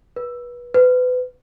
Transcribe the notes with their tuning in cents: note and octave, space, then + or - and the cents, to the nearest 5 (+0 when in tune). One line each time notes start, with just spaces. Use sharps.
B4 -25
B4 +30